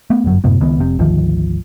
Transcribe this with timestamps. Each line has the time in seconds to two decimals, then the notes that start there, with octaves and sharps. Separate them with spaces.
0.10 A3 B3
0.24 G1 F#2 F#3
0.44 F#2 A2 C3 B3
0.61 C#2 D#3 B3
0.79 F1 C3
0.99 G#1 D2 D#3 F3